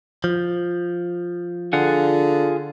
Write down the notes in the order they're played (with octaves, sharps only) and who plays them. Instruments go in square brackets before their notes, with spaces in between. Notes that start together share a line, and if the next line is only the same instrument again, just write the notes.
[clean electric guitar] F3
[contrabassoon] D3 [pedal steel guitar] F4 G#4 F#5